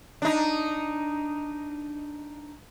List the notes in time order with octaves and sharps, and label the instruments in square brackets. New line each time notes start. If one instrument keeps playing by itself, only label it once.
[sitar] D4 D#4